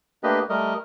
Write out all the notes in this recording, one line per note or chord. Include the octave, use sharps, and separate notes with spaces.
A3 A#3 D4 G4 B4 D#5
G3 A3 A#4 D#5